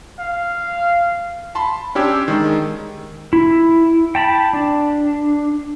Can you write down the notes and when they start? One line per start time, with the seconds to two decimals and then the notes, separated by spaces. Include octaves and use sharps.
0.19 F5
1.55 A5 B5 C6
1.95 C#4 D4 G4 E6 G#6
2.28 D#3 G#3
3.33 E4
4.15 G5 A5 B5
4.53 D4